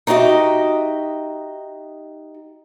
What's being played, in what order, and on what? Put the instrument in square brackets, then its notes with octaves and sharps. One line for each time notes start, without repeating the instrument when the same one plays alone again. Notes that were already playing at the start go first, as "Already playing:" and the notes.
[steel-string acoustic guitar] D#4 F#4 G4 D#5 E5